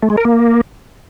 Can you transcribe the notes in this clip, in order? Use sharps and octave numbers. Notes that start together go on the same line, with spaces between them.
A3
G#3
A#4
A#3